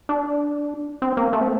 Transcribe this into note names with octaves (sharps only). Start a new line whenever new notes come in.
D4
C4
A#3
A3
C4